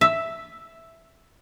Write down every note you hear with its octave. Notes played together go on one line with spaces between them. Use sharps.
E5